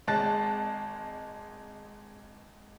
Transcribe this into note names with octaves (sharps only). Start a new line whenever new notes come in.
G#1 G#3 A5 F#6 A6